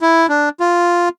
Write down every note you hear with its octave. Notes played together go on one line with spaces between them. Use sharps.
E4
D4
F4